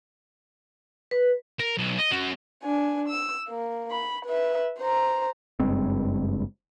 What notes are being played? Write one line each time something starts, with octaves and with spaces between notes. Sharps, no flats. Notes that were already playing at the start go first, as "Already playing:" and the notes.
B4
A#4
B1
D#5
C#4 F#4
D4 G#5
E6
A#3
B5
B4 E5
C5 A#5
F#1 G2 G#3 C4